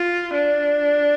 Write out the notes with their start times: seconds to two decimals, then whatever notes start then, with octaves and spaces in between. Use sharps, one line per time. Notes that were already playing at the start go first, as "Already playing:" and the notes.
Already playing: F4
0.34 D4